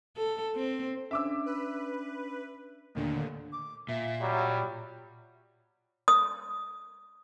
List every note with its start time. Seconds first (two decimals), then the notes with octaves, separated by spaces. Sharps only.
0.17 A4
0.55 C4
1.11 C#4 D4 D5 E5 D6 E6
1.46 B4
2.95 D#2 A#2 D3 A3 D5
3.52 D6
3.89 A#2 E5
4.21 F#3 G3
6.08 D#6